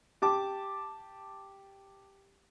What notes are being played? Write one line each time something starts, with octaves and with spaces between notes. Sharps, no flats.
G4 A5 D6